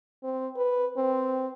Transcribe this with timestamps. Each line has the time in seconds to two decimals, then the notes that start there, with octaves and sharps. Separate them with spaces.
0.23 C4
0.56 B4
0.97 C4